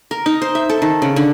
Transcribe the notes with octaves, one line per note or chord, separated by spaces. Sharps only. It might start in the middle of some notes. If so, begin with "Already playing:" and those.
A#4
D#4
C5
E5
A4
D#3
C#3
D3